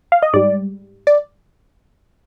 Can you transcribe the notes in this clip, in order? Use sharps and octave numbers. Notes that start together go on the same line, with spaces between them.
F5
D#5
G#2 G3 D5
D5